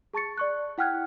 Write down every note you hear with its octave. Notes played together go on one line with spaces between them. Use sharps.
G#4 A5 C#6 A6 C#7
D5 C#6 F#6
E4 F#5 G5 F6 F#6 G#6